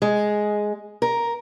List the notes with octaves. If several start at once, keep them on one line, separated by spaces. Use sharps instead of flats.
G#3
A#4